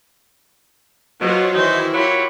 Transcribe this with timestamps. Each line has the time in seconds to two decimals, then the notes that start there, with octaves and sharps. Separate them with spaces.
1.21 B2 F#3 F4 C5
1.55 F#2 D#3 E3 D#4 E4 F#4 C5
1.94 F#3 F4 G4 A#4 B5 C#6